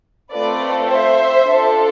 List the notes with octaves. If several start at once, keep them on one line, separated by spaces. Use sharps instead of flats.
A3 C4 F4 A4 B4 D5
C5 E5
D4 F4 A4